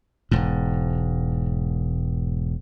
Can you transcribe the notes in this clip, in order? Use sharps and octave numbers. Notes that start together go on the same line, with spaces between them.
E1 G#2